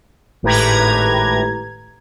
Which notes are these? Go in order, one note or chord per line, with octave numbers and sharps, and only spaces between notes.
G#1 A2 G4 B4 A#5 G#6